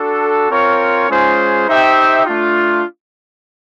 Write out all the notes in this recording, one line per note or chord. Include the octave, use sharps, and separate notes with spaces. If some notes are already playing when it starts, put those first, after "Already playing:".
Already playing: D4 F#4 A4
C4 F4 A#4 C#5
G#3 C#4 F4 G#4 C5
D#4 G4 C5 E5 G5
A3 D4 F4